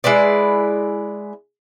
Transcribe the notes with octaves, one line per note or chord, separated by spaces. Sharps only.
G#3 E4 B4 D5